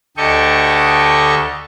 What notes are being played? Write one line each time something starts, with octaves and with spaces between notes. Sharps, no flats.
D2 G4 A4 D#5 C#6